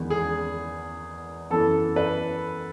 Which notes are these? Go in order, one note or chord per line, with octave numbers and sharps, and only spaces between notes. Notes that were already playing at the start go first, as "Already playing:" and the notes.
Already playing: E2 D#3 G#3 B3
G#4
F#2 E3 B3 A4
B4